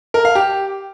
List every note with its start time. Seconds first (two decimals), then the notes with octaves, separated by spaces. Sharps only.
0.14 A#4
0.25 F5
0.35 G4